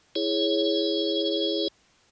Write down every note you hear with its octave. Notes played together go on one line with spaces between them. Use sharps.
E4 G#4 C#5